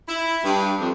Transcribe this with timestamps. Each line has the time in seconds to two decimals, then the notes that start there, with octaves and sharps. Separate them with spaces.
0.08 E4
0.44 G2
0.81 F2